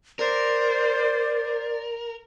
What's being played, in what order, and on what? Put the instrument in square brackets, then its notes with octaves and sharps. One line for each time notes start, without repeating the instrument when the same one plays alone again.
[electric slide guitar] A#4 [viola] C5 [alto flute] D5